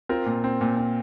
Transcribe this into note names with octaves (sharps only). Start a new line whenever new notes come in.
C4 F4 A#4
A#2
C4
A#2
C4